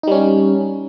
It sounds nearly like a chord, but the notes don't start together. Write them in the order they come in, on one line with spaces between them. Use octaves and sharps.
D#4 G3 C#4